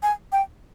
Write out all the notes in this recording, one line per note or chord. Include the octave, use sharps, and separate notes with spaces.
G#5
G5